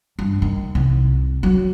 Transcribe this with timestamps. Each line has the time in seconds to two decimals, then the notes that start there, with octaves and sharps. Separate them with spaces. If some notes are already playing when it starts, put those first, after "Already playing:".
0.19 G2
0.42 D#3
0.75 C2
1.43 F#3